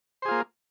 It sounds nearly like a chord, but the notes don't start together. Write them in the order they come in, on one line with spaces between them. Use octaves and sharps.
C5 G#4 F4 A#3